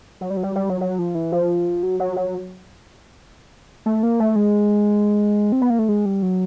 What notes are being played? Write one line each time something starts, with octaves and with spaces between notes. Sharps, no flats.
F#3
G3
F#3
G3
G3
F#3
F#3
F3
E3
F3
F#3
F#3
F#3
A3
A#3
A3
G#3
C4
B3
A#3
A3
G#3
G3
F#3